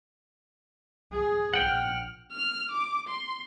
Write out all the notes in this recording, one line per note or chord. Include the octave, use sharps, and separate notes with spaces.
G#4
A#1 F#5 G5 F6
F6
D6
C6